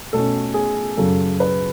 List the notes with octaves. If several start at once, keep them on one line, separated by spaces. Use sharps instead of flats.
B2 A3 C#4 A4
G#4
F#2 C#3 F#3 A4
B4